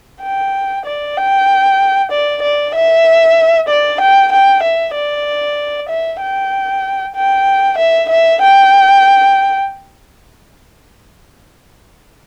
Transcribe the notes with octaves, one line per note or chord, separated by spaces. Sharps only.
G5
D5
G5
D5
D5
E5
D5
G5
G5
E5
D5
E5
G5
G5
E5
E5
G5